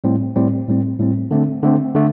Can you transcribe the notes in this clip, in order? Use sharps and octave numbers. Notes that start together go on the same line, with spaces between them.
A2 G3 C4
A2 G3 C4
A2 G3 C4
A2 G3 C4
D3 A3 C4
D3 A3 C4
D3 A3